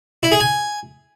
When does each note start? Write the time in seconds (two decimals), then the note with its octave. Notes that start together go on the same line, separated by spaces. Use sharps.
0.23 E4
0.32 G#4
0.40 G#5